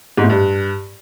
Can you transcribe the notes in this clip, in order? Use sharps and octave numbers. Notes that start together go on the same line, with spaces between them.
G#2
A2
G2